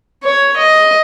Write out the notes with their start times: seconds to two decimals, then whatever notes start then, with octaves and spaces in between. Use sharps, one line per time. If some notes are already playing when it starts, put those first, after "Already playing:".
0.24 C#5
0.57 D#5